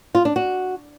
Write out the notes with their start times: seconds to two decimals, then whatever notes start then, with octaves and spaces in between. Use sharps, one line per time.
0.15 F4
0.25 D4
0.36 F#4